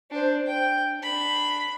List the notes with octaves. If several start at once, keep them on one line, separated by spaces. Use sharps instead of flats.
D4 C5
G5
D4 B5